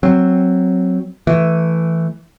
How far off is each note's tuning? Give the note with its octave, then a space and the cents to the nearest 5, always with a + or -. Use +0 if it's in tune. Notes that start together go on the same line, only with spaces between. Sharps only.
F#3 +0 C4 +0
E3 +0 A3 +0